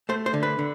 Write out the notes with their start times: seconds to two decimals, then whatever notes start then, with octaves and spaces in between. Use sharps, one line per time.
0.09 A3 C5
0.26 C5
0.34 D3
0.43 B4
0.59 D3